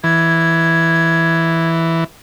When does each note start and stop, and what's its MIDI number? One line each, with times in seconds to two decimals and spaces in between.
0.04 2.04 52
0.04 1.68 92